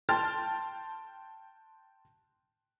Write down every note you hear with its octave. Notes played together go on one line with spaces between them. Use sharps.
G5 A5 C6 F6 A6